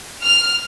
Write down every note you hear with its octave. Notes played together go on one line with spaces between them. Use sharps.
F6